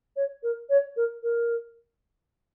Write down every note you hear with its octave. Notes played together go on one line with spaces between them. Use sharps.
C#5
A#4
C#5
A#4
A#4